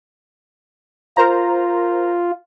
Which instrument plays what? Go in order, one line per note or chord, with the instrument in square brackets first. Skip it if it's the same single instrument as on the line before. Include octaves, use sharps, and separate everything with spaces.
[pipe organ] F4 [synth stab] A#4 C5 A#5